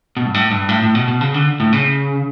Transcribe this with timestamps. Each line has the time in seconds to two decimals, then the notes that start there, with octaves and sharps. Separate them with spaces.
0.17 B2
0.26 G2
0.34 A2
0.51 G2
0.69 A2
0.82 A2
0.95 B2
1.08 B2
1.21 C#3
1.34 D3
1.60 A2
1.73 C#3